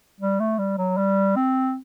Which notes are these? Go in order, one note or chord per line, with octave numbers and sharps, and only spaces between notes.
G3
A3
G3
F#3
G3
C4